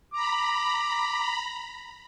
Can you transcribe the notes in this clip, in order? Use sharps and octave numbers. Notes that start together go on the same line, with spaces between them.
A#5 B5 D6